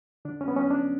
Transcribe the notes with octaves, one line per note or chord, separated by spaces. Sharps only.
D3 D4
C#4
B3
F#3 C#4
D4